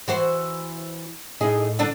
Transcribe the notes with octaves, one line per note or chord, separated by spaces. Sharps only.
E3 F#4 C5
A2 D#4 G#4
D3 D4